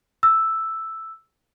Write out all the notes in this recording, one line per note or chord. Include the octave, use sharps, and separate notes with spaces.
E6